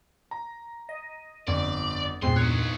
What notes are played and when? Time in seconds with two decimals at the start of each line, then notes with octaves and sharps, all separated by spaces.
0.31 A#5
0.89 D#5
1.47 G1 F2 D5
2.22 E2 G2 A#2 G#3 C4 C6
2.36 D#4 C#5 F#6